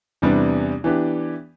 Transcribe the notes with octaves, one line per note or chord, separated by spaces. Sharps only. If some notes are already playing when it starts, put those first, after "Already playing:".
E2 C3 G3 B3 D4
E3 B3 D4 G4